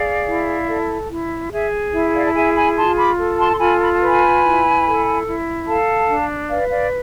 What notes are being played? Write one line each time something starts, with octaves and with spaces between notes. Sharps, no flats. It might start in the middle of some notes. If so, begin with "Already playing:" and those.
Already playing: G#4 D5 F5
E4
A4
E4
G#4 E5
E4 E5
D5 F5
A5
G#4 E5 G#5
G#5 B5
F4 A5 C6
B5 D6
A4
A5 C6
C6
F4 G#5 B5
B5
A5
B4 G#5 B5
E4
A4
E4
A4 F5 A5
D4
B4 D5 F5
D5 F5